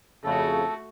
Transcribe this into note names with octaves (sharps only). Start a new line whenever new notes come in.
F2 C#3 A3 F#4 A4